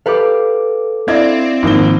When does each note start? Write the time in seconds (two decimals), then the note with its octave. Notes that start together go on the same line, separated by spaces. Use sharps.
0.06 G4 A4 B4 F5 D6
1.08 C4 D4 E4 D5 D#5 F5 G#6
1.63 G#1 F3 A#3 D#4 G7